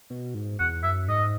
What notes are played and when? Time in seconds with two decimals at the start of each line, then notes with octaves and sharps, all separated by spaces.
0.10 B2
0.34 G#2
0.60 E2 F#5
0.83 F#2 E5
1.08 G#2 D#5